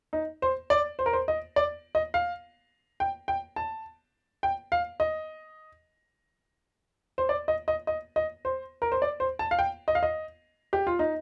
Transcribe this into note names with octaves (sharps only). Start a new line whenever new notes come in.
D#4
C5
D5
C5
A#4
C5
D#5
D5
D#5
F5
G5
G5
A5
G5
F5
D#5
C5
D5
D#5
D#5
D#5
D#5
C5
A#4
C5
D5
C5
A5
F5
G5
D#5
F5
D#5
G4
F4
D#4